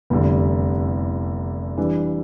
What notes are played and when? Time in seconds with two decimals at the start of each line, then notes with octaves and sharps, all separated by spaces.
0.10 F1 E2 D3 G3
1.77 E3 G3 D4